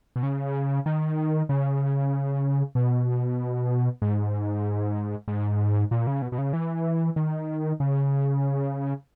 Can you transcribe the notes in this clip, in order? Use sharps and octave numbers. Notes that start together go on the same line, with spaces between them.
B2
C#3
D#3
C#3
B2
G#2
G#2
A#2
C#3
B2
B2
C#3
E3
D#3
C#3